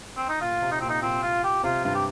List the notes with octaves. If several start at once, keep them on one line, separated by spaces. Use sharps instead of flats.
C4
D#4
A#2 F4
C3
D#4
A#2 C4
D#4
A#2 C4
F4
G4
C3 F4
G2 F4
G4